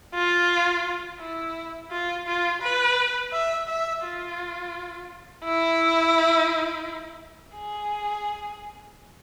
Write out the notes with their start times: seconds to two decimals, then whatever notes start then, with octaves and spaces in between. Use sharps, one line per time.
0.14 F4
1.20 E4
1.91 F4
2.26 F4
2.62 B4
3.32 E5
3.68 E5
4.03 F4
5.44 E4
7.56 G#4